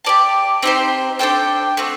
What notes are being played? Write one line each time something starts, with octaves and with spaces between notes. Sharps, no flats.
G4 A#4 D5 A5
C4 D#4 G4 C5
D4 A4 C5 G5
A3 C4 F#4